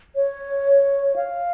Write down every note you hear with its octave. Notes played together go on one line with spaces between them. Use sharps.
C#5
F5